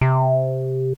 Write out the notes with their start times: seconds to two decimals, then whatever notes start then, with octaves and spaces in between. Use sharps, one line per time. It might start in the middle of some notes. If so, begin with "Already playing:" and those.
0.01 C3